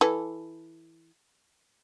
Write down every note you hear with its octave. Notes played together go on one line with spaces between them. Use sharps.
E3 A4